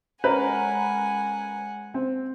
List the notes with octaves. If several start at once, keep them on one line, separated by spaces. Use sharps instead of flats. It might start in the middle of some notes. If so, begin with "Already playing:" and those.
G#3 C#4 A#4 B4 F#5 G#5
C4